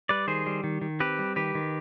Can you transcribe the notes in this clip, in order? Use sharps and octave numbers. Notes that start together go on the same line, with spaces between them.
G3 B4 D5
D#3 G#4 C5
G3
D#3
D#3
C4 G4 B4
G3
D#3 G4 B4
D#3